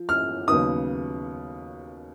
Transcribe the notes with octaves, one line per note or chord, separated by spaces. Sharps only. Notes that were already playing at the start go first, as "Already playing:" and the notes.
Already playing: F3
F6
D#2 C#3 F#3 B3 D#4 D#6